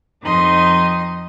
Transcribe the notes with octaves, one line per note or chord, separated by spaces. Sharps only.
F2 F3 D#4 D#5 C6